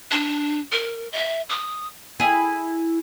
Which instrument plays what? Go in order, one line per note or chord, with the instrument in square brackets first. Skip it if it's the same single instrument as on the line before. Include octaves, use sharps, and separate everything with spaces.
[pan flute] D4
A#4
E5
D#6
[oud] E4 G#4